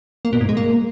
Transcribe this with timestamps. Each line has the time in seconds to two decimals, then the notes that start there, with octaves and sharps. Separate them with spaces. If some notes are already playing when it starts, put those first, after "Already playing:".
0.25 A#3
0.33 B2
0.41 G#2
0.49 G#3
0.57 A#3